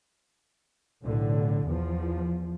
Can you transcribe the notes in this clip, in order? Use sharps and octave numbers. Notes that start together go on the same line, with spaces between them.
B1 A2 D3
E2 F3